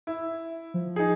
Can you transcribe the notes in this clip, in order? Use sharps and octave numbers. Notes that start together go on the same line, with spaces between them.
E4
F3
D#4 G#4